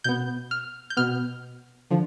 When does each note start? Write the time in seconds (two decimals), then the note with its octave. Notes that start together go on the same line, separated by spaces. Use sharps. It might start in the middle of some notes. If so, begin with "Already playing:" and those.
0.04 B2 B3 G6
0.51 F6
0.90 G6
0.97 B2 B3 F6
1.90 D3 F3